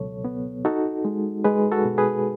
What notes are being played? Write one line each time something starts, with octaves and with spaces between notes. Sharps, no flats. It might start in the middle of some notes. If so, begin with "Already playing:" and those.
Already playing: C#2 B2 F#3 A4 C#5
B3
D#4 F#4 A4
G#3
G#3 G#4 B4
F#4 A4
B2
G#4 B4